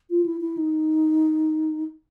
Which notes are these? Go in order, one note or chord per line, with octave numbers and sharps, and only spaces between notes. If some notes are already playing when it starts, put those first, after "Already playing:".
F4
E4
E4
D#4